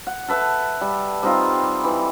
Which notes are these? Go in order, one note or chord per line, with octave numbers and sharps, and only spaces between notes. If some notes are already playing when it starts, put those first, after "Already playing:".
F#5
A4 B4 E5 A5
G3
G3 C4 D#4 F4
E3